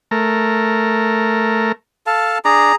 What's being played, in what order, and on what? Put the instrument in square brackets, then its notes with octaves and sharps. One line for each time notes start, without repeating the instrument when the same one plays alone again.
[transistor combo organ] A3 A#4
[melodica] A4 F5 A5
[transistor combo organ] D4 [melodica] G#4 A#5